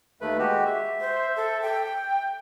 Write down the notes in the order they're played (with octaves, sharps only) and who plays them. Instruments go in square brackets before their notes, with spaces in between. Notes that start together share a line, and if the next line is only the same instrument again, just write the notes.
[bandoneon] D#2 A3 B4
G#3 F#4 G4
E5
[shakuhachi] C5
A4
G5